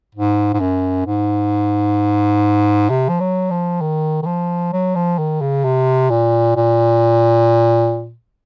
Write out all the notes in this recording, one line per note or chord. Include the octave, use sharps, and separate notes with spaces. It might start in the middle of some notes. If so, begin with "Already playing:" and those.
G#2
G#2
F#2
G#2
C3
F3
F#3
F3
D#3
D#3
F3
F#3
F3
D#3
C#3
C3
A#2
A#2